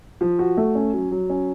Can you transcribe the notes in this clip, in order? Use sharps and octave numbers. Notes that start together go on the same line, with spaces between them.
F3
F#4
A3
C#4
F#3
F#3
C#4